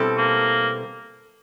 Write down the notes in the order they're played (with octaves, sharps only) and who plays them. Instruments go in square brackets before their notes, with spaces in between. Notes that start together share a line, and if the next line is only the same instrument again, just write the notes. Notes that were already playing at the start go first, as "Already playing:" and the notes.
Already playing: [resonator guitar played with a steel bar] B2 G3 C4 E4 A4
[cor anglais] A#3